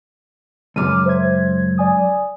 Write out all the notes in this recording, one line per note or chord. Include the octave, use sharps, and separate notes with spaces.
C#2 F#2 D6 F6 D#7
C5 E5 G#6
D5 G#5 D#6